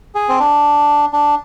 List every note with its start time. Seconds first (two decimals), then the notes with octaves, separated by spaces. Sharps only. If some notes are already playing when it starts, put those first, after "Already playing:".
0.15 G#4
0.29 C4
0.40 D4
1.13 D4